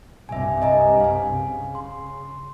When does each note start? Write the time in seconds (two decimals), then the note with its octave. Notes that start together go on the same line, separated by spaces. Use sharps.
0.29 C2 G2 C3 E5 G#5
0.62 D#5 G#5 A#5
1.00 F5 G#5
1.34 C#3
1.75 C6